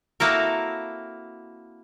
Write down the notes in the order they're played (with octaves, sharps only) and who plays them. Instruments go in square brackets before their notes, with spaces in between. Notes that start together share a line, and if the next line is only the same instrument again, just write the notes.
[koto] A#3 C4 E4 F#4 A4 A#4